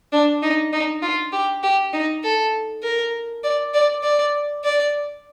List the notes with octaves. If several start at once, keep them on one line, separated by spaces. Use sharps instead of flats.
D4
D#4
D#4
F4
G4
G4
D#4
A4
A#4
D5
D5
D5
D5